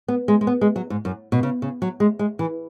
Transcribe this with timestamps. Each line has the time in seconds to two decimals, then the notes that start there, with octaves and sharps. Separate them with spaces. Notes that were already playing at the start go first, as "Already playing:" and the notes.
0.08 B3
0.28 G#3
0.41 G#3
0.47 B3
0.61 G#3
0.76 F#3
0.90 G#2
1.05 F#2
1.32 B2
1.43 C#3
1.62 C#3
1.82 F#3
2.00 G#3
2.19 G#3
2.39 E3